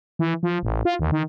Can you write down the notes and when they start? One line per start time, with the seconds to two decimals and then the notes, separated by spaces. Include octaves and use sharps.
0.19 E3
0.43 F3
0.63 A1
0.85 F4
0.99 D#2
1.12 D#3